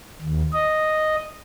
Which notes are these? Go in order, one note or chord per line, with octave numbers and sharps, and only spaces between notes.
D#2
D#5